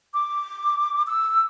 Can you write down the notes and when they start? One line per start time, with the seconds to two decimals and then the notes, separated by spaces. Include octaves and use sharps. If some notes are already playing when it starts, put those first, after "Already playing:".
0.13 D6
1.06 E6